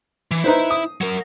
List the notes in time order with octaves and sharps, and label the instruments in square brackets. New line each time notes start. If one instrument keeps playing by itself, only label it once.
[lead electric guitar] E3
[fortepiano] D#4 B4 C5 [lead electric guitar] E4 E5
[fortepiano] D#6
[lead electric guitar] F#3 A#4